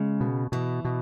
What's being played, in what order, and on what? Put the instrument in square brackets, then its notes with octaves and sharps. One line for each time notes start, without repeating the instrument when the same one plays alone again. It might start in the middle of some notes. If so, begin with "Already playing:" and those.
Already playing: [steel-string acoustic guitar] C#3 [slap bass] G#3
[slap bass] B2
[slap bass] B2 [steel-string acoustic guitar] E3
[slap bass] B2